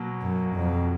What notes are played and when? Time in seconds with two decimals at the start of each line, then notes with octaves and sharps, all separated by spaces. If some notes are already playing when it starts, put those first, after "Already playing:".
Already playing: B2 F#3 A#3
0.22 F#2
0.55 F2